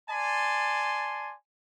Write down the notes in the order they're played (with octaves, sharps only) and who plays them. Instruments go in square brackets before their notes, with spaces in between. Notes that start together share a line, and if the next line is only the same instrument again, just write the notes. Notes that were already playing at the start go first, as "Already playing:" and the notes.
[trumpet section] D5 G#5 A5 C6